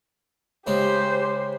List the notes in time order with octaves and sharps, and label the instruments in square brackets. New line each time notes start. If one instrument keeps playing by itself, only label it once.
[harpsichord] C#3 G#3 [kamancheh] G4 C5